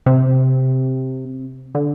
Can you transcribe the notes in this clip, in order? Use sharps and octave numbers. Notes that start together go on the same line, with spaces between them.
C3
D3